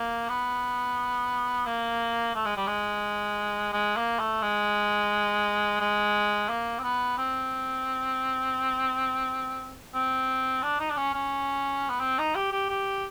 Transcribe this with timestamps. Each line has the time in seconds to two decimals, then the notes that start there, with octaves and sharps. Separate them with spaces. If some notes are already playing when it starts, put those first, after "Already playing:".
Already playing: A#3
0.29 B3
1.66 A#3
2.35 A3
2.45 G#3
2.57 G3
2.67 G#3
3.73 G#3
3.96 A#3
4.19 A3
4.42 G#3
5.80 G#3
6.49 A#3
6.78 C4
6.83 B3
7.18 C4
9.94 C4
10.62 D4
10.80 D#4
10.90 D4
10.97 C#4
11.14 C#4
11.89 B3
12.00 C4
12.18 D#4
12.35 G4
12.52 G4
12.69 G4